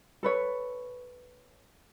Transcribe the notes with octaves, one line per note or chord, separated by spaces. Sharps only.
A4 B4 C#5 B5